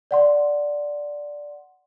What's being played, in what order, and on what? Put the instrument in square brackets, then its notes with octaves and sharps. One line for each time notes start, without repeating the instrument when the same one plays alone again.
[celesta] D5 F#5 C6